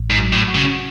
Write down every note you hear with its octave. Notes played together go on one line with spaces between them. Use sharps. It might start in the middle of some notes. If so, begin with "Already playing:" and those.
Already playing: A1
G#2
F#3
A2
F#4
C#3